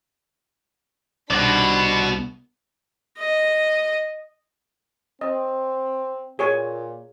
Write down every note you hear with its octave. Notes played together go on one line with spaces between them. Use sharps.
C2 B2 D4 D5 F#5 B5
D#5
C4 D#5
A#2 G#4 C#5 G#5